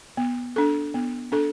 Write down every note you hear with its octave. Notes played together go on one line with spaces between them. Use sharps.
B3
D4 A4
B3
D4 A4